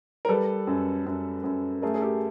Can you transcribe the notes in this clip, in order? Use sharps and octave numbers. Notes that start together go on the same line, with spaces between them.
A#4
G3 A4 B4
F#2
F#2
F#2
A3 G#4 A#4
G#4
G4 A4